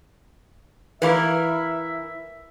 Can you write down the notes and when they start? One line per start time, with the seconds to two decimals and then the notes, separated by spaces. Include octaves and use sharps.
1.02 E3 E4 A#4 B4 E5 F5 D6